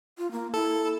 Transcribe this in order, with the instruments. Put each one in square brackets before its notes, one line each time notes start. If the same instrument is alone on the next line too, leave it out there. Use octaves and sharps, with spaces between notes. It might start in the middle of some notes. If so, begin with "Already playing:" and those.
[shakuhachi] F4
A#3
[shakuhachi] E4 [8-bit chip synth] A4